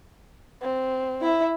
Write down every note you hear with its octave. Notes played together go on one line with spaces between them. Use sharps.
C4
E4 E5